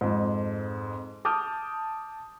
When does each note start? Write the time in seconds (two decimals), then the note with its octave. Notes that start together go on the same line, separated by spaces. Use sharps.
0.01 F2 G#2
1.25 A5 D6 D#6 F6 G6